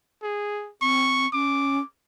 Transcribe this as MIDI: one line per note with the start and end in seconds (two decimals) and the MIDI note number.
0.23 0.70 68
0.82 1.27 60
0.82 1.28 85
1.33 1.80 61
1.33 1.84 86